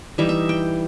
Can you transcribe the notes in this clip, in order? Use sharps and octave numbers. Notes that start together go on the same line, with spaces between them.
E3 G3 D#4 E5
E5
G5